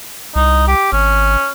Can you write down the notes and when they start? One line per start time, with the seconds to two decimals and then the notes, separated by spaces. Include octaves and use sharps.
0.36 C2 D#4
0.68 G4
0.92 G#1 C#4